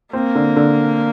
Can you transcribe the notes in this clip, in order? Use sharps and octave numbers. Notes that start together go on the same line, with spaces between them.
A#3 C4
D3
D3